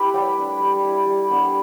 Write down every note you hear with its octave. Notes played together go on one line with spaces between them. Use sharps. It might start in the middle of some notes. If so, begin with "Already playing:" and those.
Already playing: A3 E4 G4 A4 B4
G3 D5 G5
D4
G3
E4
G3
B3 D4